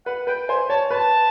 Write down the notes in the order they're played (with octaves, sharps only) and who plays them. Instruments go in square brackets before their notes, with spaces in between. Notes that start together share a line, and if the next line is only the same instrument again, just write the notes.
[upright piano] B4 [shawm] F#5
[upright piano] B4 [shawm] G5
[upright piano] C5 [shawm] G#5
[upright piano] C#5 [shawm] A5
[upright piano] B4 [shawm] A5